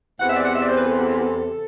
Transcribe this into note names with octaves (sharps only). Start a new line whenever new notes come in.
E2 C3 E3 F#5
E5
D5
F#5
E5
D5
C5
B4
A4